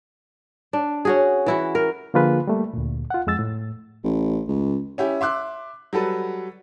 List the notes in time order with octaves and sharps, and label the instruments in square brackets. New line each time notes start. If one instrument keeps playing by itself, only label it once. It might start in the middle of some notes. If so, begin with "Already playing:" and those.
[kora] D4
C#4 F#4 G#4
E3 E4 F#4
A#4
[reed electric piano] D3 F3 A#3 F4 G#4 B4
G3 A3 A#3
D2 A#2
F4 F#5
F2 G#3 E6 A6
A2
[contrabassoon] A1
C#2
[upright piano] C#4 E4 G4
E5 C6 D6 F#6
F#3 G3 A4 B4